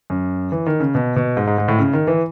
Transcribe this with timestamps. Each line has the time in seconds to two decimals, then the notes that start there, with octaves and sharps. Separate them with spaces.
0.10 F#2
0.52 E3
0.66 D#3
0.80 C#3
0.95 B2
1.16 B2
1.37 G#2
1.47 G#2
1.58 G#2
1.68 A2
1.79 C#3
1.93 D#3
2.07 E3